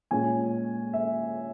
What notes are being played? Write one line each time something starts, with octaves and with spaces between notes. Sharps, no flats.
A#2 G#3 C#4 G#5
E5